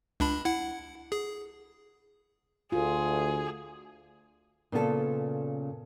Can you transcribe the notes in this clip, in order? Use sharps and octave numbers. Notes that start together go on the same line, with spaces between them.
C#2 D4 B5
E4 F#5
G#4
D2 F4 G#4
A#2 C#3 B3 F4 F#4 A4